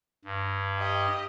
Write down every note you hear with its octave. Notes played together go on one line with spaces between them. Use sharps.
G2
G4 D#5